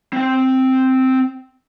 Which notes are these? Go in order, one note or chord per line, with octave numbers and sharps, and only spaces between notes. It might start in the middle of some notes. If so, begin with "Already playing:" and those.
C4 G5